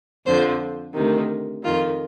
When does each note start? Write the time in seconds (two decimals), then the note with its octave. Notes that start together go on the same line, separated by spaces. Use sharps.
0.26 F2 D3 F3 C5
0.96 D2 C3 D#3
1.64 F2 D#3 F4